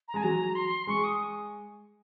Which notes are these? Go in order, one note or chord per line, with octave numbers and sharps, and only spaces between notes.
A#5
G#3 G#5
F#3 A#5
C6
G#3 C#6
D#6